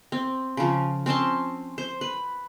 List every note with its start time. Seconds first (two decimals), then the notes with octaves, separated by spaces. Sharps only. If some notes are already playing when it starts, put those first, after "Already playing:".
0.12 C4
0.57 C#3 F3
1.06 C4 C#4 A5 C6
1.78 C5
2.01 B4